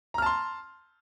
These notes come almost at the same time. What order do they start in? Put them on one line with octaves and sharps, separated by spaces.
A#5 F6 A5 C6